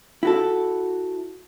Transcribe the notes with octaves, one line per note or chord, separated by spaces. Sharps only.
E4 F#4 A4